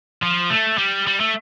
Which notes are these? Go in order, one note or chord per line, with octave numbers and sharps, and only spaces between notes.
F3
A3
G3
G3
A3